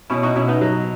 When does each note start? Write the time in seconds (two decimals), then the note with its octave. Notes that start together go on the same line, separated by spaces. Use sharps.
0.10 B2 C#4 E4
0.23 D#4 F#4
0.36 B2 C#4 E4
0.48 B3 D#4
0.61 F#3